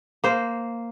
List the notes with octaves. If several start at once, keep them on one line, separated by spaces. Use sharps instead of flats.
A#3 C5